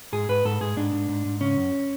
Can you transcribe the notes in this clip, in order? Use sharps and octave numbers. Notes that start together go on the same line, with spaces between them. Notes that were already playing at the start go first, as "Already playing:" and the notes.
G#2 G#4
G#2 B4
G#2 A4
G#2 G#4
G#2 D4
G#2
G#2
G#2
C#3 C#4
F#2